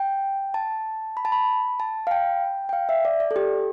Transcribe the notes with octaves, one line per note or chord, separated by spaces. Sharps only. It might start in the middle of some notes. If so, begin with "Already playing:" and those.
Already playing: G5
A5
B5
A5
B5
A5
F5
G5
G5
F5
E5
D5
D5
A4
G4